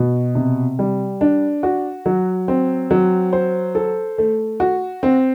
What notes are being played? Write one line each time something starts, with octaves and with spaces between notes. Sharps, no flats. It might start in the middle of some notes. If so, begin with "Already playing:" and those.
Already playing: B2
C3
G3
D4
F#4
F#3
C4
F#3
C5
A4
A3
F#4
C4